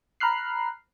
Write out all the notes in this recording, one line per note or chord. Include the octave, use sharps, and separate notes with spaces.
A#5 B5 F6 F#6 C7